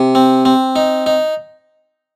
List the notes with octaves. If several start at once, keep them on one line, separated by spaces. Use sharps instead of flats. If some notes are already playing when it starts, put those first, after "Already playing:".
Already playing: C3
C4
C4
D#4
D#4